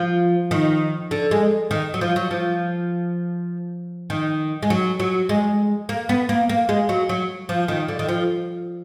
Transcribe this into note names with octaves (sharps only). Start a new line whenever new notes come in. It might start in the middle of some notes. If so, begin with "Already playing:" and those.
Already playing: F3
D#3
D3
G#3
D#3
F#3
F3
F#3
F3
D#3
G#3
F#3
F#3
G#3
A#3
B3
A#3
A#3
G#3
F#3
F#3
F3
D#3
D3
D#3
F3